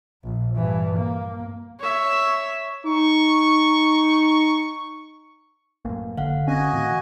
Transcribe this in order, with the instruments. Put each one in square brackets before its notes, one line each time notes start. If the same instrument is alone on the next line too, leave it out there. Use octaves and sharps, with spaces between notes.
[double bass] A#1
G2 E3
A#3
[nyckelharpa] C#5 E5
[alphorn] D#4 [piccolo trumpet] C#6
[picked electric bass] A1 F#2 [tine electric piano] A#3
[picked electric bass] F1 [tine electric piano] D3 [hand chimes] F5 F#5
[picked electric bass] F1 C4 C#4 [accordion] F#4 D#5 G#5
[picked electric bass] A2 D#3 E3